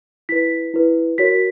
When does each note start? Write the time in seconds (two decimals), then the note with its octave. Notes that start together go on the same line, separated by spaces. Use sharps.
0.29 E4 B4 B6
0.74 E4 B4
1.18 F#4 A#4 C#5 B6